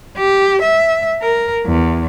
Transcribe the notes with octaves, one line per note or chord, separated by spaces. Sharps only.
G4
E5
A#4
E2